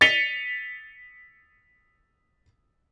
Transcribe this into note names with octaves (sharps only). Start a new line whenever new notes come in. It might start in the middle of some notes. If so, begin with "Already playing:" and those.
A6 B6 C#7 D#7 F7 G7